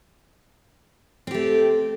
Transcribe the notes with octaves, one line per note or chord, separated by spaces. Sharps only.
A3 C4 G4